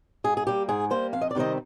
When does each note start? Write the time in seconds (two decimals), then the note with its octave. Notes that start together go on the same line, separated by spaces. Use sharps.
0.24 G#2 G#4
0.37 G#4
0.47 G3 A#3 G4
0.69 G#2 G#4
0.90 G3 A#3 C5
1.13 F2 F5
1.21 D#5
1.31 D5
1.35 C3 D#3 G3 C4 D#5